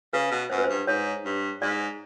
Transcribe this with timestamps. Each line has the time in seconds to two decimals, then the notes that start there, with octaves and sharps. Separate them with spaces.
0.13 C#3 B4
0.31 B2
0.50 F#2 C5
0.58 B4
0.64 C5
0.69 G2
0.87 G#2 C#5
1.25 G2
1.61 G#2 D5